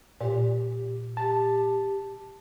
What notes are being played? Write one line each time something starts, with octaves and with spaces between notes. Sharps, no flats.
A#2 G4
G4 A5